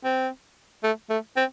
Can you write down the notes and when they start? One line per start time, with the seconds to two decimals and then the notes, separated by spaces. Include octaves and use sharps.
0.04 C4
0.83 A3
1.10 A3
1.36 C4